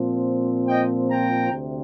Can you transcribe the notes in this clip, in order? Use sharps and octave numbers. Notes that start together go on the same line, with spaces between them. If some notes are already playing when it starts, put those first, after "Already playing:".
Already playing: A#2 F3 C4
D#5 G5
G5 A#5
D2 C3